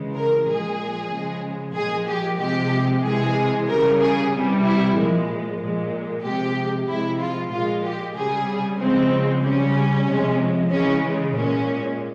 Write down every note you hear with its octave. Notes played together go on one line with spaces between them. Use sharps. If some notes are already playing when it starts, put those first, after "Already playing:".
Already playing: C#3 E3 G#3
A#4
A#2 F3 G#3 G#4
C#3 F3 G#3
A#2 F3 G#3 G#4
G4
C3 F3 G#3 G4
C3 E3 G#3 G#4
C#3 G3 A#4
G#4
C3 E3 G3
E4
A#2 F3 G#3
A#2 G#3
C3 F3 G#3 G4
C3 F3 G#3 E4
F4
A#2 G#3 F4
G4
C#3 G3 G#4
C#3 F3 G#3 C4
C#3 G3 C#4
C3 F3 G#3
C#3 E3 G#3 C#4
A#2 G#3 C#4